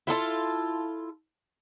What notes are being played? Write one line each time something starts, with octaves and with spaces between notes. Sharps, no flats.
E4 F4 A4 A5